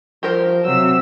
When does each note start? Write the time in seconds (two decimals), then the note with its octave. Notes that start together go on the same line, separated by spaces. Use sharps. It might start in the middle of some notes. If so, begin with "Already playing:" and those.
0.23 F3 G4 A#4 C5
0.65 C3 F#3 E6